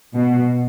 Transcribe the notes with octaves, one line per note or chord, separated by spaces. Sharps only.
B2